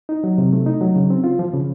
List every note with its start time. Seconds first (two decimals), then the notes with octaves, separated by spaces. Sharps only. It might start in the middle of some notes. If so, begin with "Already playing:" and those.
0.09 D#4
0.24 F#3
0.38 C3
0.53 A3
0.66 D#4
0.81 F#3
0.96 C#3
1.10 C4
1.24 F4
1.39 F3
1.54 C#3